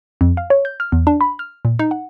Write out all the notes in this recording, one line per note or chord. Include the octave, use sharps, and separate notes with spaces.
F2
F5
C#5
G6
F6
E2
D4
B5
F6
A#2
D#4
F#5